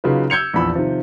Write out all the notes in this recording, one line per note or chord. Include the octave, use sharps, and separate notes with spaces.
C#3 F#3 D#4 F4 B4
E6 G6 G#6 C#7 F7
A#1 E2 B5 E6
C3 D#3 F3